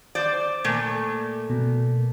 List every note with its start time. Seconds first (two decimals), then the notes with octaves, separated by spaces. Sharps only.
0.15 C5 D5
0.64 A#2 A3
1.50 B2